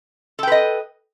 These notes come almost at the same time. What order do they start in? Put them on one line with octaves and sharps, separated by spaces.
A4 G5 B4 D#5